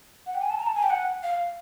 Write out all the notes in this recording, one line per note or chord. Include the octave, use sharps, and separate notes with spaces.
F#5
G5
G#5
A5
A#5
A5
G#5
G5
F#5
F5